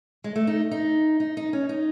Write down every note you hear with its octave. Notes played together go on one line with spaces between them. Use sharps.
G#3
A3
D#4
D#4
D#4
D#4
C#4
D#4